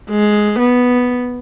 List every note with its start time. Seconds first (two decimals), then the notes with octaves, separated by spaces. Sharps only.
0.10 G#3
0.59 B3